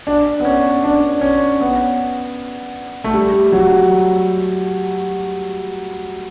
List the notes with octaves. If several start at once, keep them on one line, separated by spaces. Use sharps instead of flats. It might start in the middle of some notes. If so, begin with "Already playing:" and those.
D4
B3
C#4
D4
C#4
B3
A3
G3
F#3